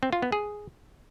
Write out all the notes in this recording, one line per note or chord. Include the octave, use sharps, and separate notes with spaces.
C4
F4
B3
G#4